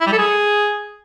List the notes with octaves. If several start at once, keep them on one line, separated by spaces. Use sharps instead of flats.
E4
G3
A4
G#4